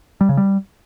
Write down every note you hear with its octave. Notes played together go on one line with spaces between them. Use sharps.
G3
C#3
G3